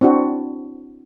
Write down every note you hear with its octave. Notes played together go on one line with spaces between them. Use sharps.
C4 D4 E4 F#4